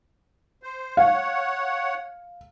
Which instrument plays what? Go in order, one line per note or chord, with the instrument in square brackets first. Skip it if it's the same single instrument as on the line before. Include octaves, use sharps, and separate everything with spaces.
[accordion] C5
[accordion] C#5 F#5 [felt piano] F5